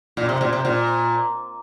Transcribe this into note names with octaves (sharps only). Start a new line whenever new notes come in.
A#2
C3
A#2
C3
A#2